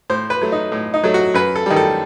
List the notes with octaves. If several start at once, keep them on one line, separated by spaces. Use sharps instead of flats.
A2 C5
B4
F#3 A3
D#4
A2
D#4
F#3 A3
F#4
F#2 B4
A4
D#3 G3
A4